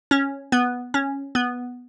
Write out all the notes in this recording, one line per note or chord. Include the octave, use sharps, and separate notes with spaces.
C#4
B3
C#4
B3